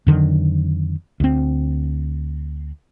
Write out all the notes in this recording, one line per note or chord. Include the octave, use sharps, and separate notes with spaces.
F2 D3 D#3 F#3
D2 C4